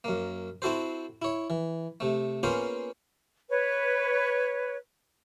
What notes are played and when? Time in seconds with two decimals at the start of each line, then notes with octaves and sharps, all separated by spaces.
0.04 F#2 A#3
0.62 C4 E4 F#4 A4 C5
1.22 E4 C#5
1.50 E3
2.00 C3 A3
2.43 A#3 B3 C#4 F4 G#4 C5
3.50 B4 C#5